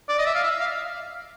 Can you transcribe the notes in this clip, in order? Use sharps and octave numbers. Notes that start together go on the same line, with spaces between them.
D5
D#5
E5
F5
E5
F5